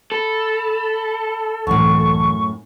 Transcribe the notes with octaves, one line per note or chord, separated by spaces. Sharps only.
A4 B5
C#2 F#2 A2 E3 C#6